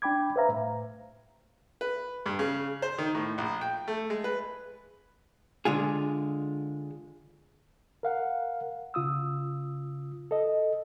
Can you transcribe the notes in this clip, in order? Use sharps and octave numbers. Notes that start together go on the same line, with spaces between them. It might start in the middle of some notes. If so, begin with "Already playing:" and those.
D4 G5 B5 D6 G#6
B4 C5 E5 F5 A#5
A2
B4
G2
C#3
C5
D#3
A2
A#1
G5
A3
G#3
B4
D3 G#3 F4 G#4
A#4 F5 F#5
C#3 F4 D#6 E6
A4 D#5